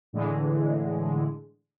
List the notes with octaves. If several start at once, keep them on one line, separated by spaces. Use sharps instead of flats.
A2 D3 E3 G#3